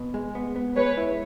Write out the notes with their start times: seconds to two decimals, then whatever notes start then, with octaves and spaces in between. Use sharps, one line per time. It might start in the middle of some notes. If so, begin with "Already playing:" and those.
Already playing: B2
0.14 G#3
0.35 B3
0.56 B3
0.76 G#3 B4 C#5
0.97 E4